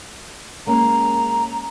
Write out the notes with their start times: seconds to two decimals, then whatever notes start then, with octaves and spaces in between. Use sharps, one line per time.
0.67 G#3 A#3 C#4 A#5